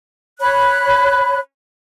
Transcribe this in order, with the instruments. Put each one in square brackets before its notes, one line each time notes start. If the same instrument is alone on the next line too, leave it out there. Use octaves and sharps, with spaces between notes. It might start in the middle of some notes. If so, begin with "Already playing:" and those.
[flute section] C#5 B5 F#6